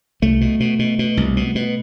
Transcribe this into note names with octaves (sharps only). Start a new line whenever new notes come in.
C2 A3
B2
B2
B2
B2
C2
B2
B2